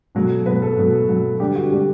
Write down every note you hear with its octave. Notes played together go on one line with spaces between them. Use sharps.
B2 F#3 A3
B2 F#3 A3 B4
A4
B2 F#3 A3
B2 F#3 A3
D3 G3 G4
F#4
D3 G3 G4